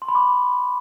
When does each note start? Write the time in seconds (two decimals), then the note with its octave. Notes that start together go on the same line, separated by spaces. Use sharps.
0.02 C6
0.09 B5
0.15 D6